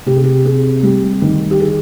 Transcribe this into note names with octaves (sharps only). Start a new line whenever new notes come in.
C3 G4
G#4
G4
C4 G#4
G3 G4
D#3
G4
G#4